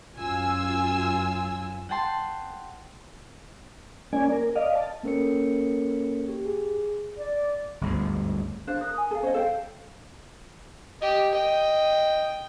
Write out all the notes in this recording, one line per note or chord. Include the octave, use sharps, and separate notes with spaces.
F#2 F4 G#5 E6
F#5 G5 A5 C6
A#3 C#4 D5 G#5
A#4
D5 D#5 F5
A5
A#3 C#4 A4 A#4 C#5 C#7
G4
G#4
D5
G1 D2 G#2
D4 C5 F5 F#6
A#4 D#6
G#5
A4 F5
C#4 C5 C#5 D#5
A4 C5 F5 G5
G4 D#5
D#5 G5